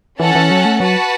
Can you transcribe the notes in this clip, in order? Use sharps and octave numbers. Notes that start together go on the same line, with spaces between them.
E3 C#4 A4 F#5 A5
E3
F#3
A3
F#3 F#4 B4 F#5 A5